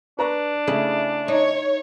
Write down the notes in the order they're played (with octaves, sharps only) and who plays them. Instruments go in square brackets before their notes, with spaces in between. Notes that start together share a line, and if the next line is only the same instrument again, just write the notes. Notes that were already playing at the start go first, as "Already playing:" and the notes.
[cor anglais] D4 [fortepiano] B4 A#5 C#6
[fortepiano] C#3 A3 [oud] E4 G#4
[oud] D#4 [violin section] C#5